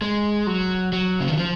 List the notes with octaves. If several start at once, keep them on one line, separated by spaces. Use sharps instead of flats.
G#3
F#3
F#3
C#3
D#3
F3